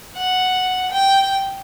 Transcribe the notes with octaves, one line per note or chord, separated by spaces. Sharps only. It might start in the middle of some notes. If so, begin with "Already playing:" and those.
F#5
G5